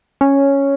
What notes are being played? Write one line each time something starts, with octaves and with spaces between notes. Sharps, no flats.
C#4